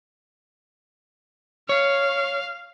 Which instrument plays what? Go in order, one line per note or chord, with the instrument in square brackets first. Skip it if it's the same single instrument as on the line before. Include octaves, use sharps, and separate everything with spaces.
[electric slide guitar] C#5 [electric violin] F5